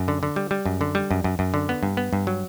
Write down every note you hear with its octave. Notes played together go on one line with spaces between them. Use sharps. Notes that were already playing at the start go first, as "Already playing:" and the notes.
Already playing: F#2
D3
D3
G3
G3
F#2
D3
G3
F#2
F#2
F#2
D3
B3
G2
B3
G2
F#3